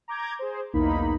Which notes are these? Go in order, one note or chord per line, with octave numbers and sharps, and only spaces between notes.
A#5 D6 G6 G#6
G#4 C5
B1 E2 A#3 D#4 B5